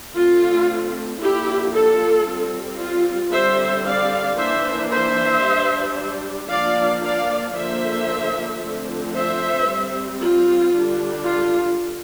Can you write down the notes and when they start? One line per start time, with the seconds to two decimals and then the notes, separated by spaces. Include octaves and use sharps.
0.14 D3 A3 C4 F4
1.20 D3 F3 A#3 D4 E4 G4
1.73 F4 A4
2.26 G3 C4
2.80 F4
3.32 D3 G3 C4 C5 E5
3.85 D5 F5
4.38 E3 A#3 D4 C5 E5
4.91 C5 E5
5.43 G3
5.49 D4
6.50 F3 A#3 D4 D5 F5
7.03 D5 F5
7.55 D3 F3 A#3 C5 E5
8.61 D3 F3 A3 C4
9.15 C5 E5
9.68 G3 C4
10.21 F4
10.74 D3 G3 D4
11.25 F4